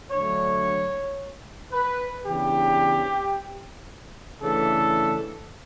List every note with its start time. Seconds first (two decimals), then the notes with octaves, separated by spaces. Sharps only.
0.11 D3 F#3 A3 D4 C#5
1.72 B4
2.26 C#3 E3 B3 D4 G4
4.42 C#3 E3 A3 D4 A4